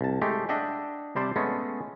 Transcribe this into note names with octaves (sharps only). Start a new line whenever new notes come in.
C2 A5
G#3 A3 G4
D4 D#5 E5 F#5 G5
C3 G3 C5 D5 A5
G#3 A3 B3 C#4